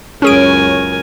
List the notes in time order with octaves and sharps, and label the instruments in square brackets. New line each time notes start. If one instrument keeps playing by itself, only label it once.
[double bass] C#2 F#2 [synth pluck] C#4 G#4 D7 [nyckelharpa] A#4 G#5 [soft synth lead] C#5